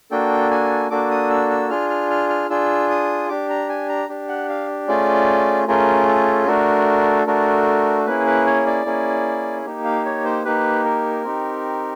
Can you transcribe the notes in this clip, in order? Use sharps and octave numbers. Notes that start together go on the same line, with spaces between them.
A#3 D4 F#4 A4 G5
G#5
A#3 D4 F#4 A4 D6
D#6
E6
E6
D4 F4 G#4 F6
F6
F6
F6
D4 F4 G#4 E6
D#6
D4 G4 D6
A#5
G#5
A#5
D4 G4
F#5
F5
A3 C#4 F4 G#4 D5
A3 C#4 F4 G#4 A#4
A4
A3 D4 F#4 A4 A#4
A3 D4 F#4 A4 A#4
A#3 C#4 E4 G#4 B4
B4
C#5
D5
A#3 C#4 E4 G#4
A#3 D#4 G4
F5
C#5
C5
A#3 D#4 G4 B4
A#4
C4 D#4 G4